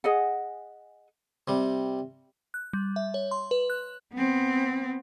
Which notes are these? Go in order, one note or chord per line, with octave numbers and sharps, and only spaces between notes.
G#4 D#5 F#5
C3 G3
F#6
G3
E5
C#5
C6
B4
F#6
B3 C4